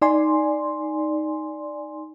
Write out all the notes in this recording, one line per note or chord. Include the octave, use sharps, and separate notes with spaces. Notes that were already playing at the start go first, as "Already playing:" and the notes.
D#4 D5 G#5 C6